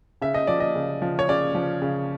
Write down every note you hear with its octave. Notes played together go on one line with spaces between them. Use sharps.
C#3 E5
D#5
F3 D5
D#5
C#3
F3
C#5
C#3 D5
F3
C#3